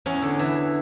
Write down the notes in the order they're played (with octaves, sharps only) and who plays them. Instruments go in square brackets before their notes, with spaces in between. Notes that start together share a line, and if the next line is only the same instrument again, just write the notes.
[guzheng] E2 C#4
D3
E3